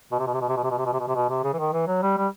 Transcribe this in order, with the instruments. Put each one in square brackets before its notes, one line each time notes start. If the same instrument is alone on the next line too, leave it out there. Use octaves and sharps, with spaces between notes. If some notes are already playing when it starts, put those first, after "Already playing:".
[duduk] B2
C3
B2
C3
B2
C3
B2
C3
B2
C3
B2
C3
B2
C3
B2
C3
C#3
E3
D#3
E3
F#3
G3
G3